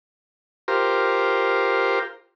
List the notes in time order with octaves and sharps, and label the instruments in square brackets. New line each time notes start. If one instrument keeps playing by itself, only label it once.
[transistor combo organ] F4 G4 A#4 C5